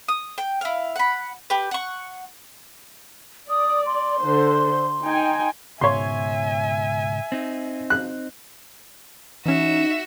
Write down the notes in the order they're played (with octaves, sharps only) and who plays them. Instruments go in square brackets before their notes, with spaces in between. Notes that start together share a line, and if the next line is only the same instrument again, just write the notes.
[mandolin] D#6
G5
E4 F5
F#5 B5
G4 B4
F#5 C#6
[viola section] D5 [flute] D#6
[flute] C6
[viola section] D3 C5
D#4 G5 G#5
[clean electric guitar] C#2 G#2 B2 [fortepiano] C#5 C6 [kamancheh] E5 G#5
[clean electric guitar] C4 D#4
[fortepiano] F#6
[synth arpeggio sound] E3 C#4 [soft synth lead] D#4 [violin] F#4 E5